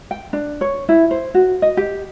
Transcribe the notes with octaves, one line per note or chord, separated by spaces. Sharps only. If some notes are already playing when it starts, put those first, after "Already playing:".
G5
D4
C#5
E4
C5
F#4
D#5
G4